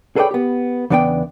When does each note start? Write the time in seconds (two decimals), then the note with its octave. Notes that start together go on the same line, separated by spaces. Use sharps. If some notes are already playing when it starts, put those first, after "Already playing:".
0.16 G#4 A4 B4 C#5 D5 G5
0.31 B3 G4
0.90 E2 C#3 B3 D4 D5 G5